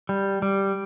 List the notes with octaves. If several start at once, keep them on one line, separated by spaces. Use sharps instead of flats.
G3
G3